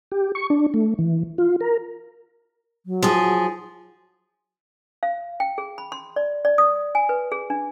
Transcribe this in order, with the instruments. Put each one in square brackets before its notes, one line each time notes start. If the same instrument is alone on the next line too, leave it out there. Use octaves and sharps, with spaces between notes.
[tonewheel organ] G4
C#6
D4
A3
E3
F4
A#4
[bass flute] F#3
[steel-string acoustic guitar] F3 G#4
[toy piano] F5
G5
G#4
B5
C6
D5
D5
D#6
G#5
B4
G#4
D4